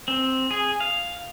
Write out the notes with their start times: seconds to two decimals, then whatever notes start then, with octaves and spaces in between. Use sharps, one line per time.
0.08 C4
0.51 G#4
0.80 F5